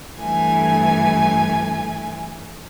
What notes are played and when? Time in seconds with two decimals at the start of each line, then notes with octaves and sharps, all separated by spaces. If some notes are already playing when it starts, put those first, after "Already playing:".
0.17 G2 E3 A3 G#5 G#6